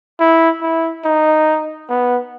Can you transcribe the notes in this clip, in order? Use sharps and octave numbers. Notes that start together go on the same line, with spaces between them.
E4
E4
D#4
B3